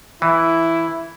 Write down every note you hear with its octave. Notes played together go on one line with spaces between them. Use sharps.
E3 E4